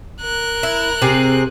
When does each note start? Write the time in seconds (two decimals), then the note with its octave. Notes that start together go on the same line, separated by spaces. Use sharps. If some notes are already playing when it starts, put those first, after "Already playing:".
0.22 A#4 F#6
0.63 E4
1.02 C3 C4 G#4